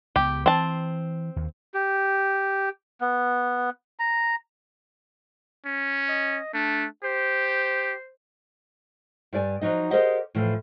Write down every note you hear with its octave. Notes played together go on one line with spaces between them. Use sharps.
C#2 F#3 B3 G4
E3 C4 A5
D#2
G4
B3
A#5
C#4
D#5
A3 D4
G4 C5
G2 G4 D5 G#5
F3 F#3 D#4 D#5
G4 G#4 A#4 C5 D#5 F#5
A2 E3 F3